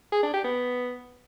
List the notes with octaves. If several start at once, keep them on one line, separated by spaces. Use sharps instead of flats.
G#4
D4
G4
B3